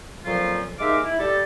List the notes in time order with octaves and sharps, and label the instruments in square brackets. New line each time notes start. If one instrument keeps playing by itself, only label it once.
[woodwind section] F2 A#2 F3 F#3 C#4 F4
D#2 G#3 D#4 E5 F5 D6
E4
G3 G4 A4